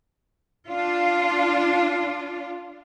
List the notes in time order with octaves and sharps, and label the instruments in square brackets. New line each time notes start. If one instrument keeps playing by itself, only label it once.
[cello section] D4 F4